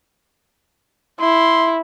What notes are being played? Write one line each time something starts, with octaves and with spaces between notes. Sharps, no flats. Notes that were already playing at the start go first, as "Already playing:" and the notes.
E4 C6